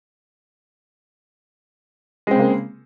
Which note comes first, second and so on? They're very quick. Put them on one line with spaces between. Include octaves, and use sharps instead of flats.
G#3 C4 C#3 A#3